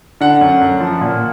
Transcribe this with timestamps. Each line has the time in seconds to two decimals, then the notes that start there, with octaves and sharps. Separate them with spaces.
0.21 D3 F#5
0.41 F#2
0.61 F#2
0.80 F3
1.01 A#2